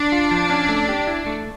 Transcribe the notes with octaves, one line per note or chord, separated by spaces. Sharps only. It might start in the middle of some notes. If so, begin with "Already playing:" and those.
Already playing: D4
F4
F3
C#4
A3
G4
E4
A3